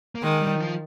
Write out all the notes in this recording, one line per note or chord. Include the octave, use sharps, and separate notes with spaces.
A#3
D#3 G#3
G3
D#3
F3